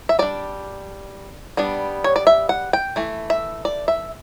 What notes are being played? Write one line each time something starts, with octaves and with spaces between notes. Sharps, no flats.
E5
G3 D4 D5
G3 B3 D4
C#5
D5
E5
F#5
G5
E3 A3
E5
D5
E5